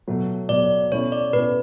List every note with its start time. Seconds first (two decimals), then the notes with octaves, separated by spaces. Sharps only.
0.08 B2 F#3 A3
0.49 B2 F#3 A3 D5
0.91 B2 A3 C#4 E4 C#5
1.12 D5
1.33 B2 A3 C#4 E4 B4